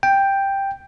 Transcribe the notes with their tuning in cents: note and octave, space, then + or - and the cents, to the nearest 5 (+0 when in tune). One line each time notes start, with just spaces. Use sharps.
G5 +5